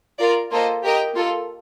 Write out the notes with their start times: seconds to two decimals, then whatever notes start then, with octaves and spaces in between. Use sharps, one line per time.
0.19 F4 A#4 D5
0.51 A#3 F4 A4 C5 D#5
0.83 G4 A#4 D#5 G5
1.14 A#3 F4 A4